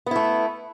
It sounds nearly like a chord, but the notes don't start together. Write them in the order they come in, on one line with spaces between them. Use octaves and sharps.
B3 E4 A3